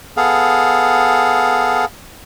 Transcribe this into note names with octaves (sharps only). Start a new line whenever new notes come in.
B3 G#4 A4 F5